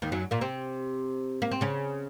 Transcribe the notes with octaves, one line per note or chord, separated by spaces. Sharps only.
D#2 D#3
F#2 F#3
A#2 A#3
C3 C4
A#3
C4
C#3 C#4